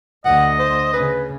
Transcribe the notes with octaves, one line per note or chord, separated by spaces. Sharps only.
D2 D3 D#5 F#5
C5
C#3 B4